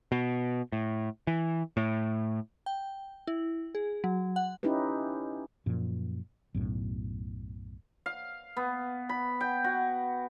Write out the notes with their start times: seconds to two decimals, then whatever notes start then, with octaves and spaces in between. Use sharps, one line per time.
0.12 B2
0.72 A2
1.27 E3
1.77 A2
2.66 G5
3.27 E4
3.75 G#4
4.04 F#3
4.36 F#5
4.63 C#4 D#4 E4 G4 B4
5.66 F#2 A#2 F3
6.54 B1 F#2 A2
8.06 F5
8.57 B3
9.09 B5
9.41 G5
9.64 F#4